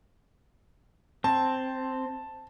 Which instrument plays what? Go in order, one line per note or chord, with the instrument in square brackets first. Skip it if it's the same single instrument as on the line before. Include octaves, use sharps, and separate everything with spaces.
[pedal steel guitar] C4 [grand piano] A5